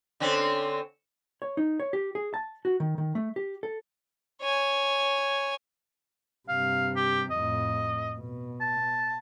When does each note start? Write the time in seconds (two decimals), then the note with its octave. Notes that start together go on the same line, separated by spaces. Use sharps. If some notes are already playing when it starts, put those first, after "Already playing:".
0.20 D3 C4 C#4
1.42 C#5
1.57 D#4
1.80 C#5
1.93 G4
2.15 G#4
2.34 A5
2.65 F#4
2.80 D#3
2.98 D#3
3.15 A3
3.36 G4
3.63 A4
4.42 C#5 G#5
6.49 G2 C3 F5
6.96 G4
7.30 F2 A2 D#5
8.18 B2
8.60 A5